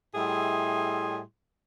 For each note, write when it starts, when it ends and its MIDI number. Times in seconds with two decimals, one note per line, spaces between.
0.15 1.20 45
0.15 1.20 55
0.15 1.20 64
0.15 1.20 68
0.15 1.20 75
0.15 1.20 84